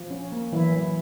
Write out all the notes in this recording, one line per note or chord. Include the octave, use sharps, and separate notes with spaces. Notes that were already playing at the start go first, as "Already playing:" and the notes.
Already playing: F3
C#4
A#3
E3 F#3 E4
F#3